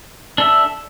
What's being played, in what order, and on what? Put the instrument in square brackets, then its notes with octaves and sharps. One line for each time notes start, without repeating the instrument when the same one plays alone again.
[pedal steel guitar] D4 A4 E5